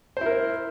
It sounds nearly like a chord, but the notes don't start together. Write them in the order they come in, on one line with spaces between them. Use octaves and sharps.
C5 E4 A#4